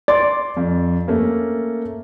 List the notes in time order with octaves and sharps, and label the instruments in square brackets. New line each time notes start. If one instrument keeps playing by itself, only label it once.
[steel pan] D5 [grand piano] C6 A6
[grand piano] F2
A3 A#3 C#4